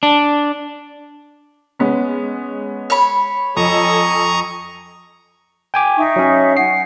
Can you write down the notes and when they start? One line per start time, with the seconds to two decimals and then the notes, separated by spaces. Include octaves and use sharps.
0.03 D4
1.79 G#3 B3 C#4
2.90 C#5 B5
3.57 F2 A4 D#5 G#5 A#5 C#6 D#6
5.74 G5 G#5 D6
5.97 D#4 E5 C#6
6.16 F#3 C#4
6.57 F#5 G#5 C7